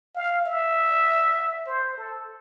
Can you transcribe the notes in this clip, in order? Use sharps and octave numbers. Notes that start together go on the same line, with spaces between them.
F5
E5
C5
A4